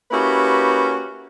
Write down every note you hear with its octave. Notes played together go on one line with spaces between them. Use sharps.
A#3 C#4 E4 F#4 G4 B4